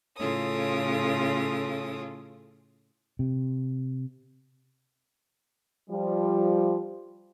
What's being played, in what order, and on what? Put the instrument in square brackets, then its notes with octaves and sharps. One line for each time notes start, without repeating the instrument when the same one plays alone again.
[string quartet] A2 C#3 F4 A4 C#5 D#6
[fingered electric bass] C3
[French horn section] F3 G3